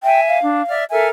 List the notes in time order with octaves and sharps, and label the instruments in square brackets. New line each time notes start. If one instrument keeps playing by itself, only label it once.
[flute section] E5 G#5 [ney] G5
[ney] F5
[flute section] D4
D5 E5 F6
[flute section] A4 A#4 G#5 [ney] E5